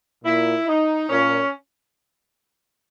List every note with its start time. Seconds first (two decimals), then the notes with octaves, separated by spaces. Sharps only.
0.25 A#2 E4
0.67 D#4
1.09 A#2 C#4